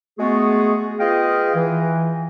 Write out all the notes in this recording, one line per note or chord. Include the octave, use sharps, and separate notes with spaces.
G#3 A3 B3 F#4 G#4
F4 G#4 B4 D#5 F5 G5
E3